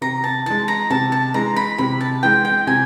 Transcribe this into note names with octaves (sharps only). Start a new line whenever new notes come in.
C3 A#5
A5
E3 G#3 A5
A#5
C3 A5
A5
E3 G#3 A#5
B5
C3 B5
A5
E3 G#3 G5
G5
C3 G#5